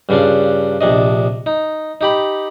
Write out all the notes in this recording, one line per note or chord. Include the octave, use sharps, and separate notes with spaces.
G2 C#3 D4 F4
A#1 C3 D4 D#5
D#4
D#4 G4 B5